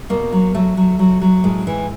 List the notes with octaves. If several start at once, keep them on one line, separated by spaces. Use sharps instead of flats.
B2 A#3
F#3
F#3 A3
F#3
F#3
F#3
A2 G#3
E3